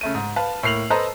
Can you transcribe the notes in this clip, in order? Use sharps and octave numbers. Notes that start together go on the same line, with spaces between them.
C#3 A3 D#7
G#2
B4 F5 A5
A2 A#3 C7 F7 F#7
A4 B4 C5 D#5 A5 A#5